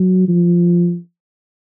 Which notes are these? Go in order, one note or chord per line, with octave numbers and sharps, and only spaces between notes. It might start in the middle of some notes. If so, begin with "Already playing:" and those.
Already playing: F#3
F3